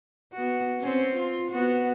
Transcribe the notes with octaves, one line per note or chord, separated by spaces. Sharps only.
B3 F#4
C4 C#4
F4
B3 F#4